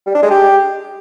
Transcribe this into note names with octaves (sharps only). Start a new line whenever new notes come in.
G3
D4
G#3
G4